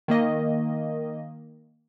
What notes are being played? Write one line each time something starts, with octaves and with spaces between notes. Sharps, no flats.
D#3 A#3 D#5